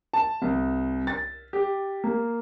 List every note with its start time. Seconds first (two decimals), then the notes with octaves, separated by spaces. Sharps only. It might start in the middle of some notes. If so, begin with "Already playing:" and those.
0.13 A5
0.42 C2
1.07 A6
1.53 G4
2.04 A#3